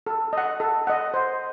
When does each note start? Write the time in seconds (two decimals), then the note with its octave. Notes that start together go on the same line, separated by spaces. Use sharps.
0.07 A4
0.33 D#5 F#5
0.60 A4
0.87 D#5 F#5
1.14 C5